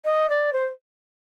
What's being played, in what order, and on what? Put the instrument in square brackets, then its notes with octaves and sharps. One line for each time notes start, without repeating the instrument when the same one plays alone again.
[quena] D#5
D5
C5